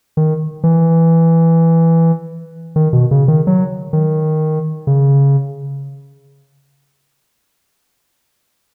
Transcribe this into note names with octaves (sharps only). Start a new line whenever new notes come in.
D#3
E3
D#3
B2
C#3
D#3
F#3
D#3
C#3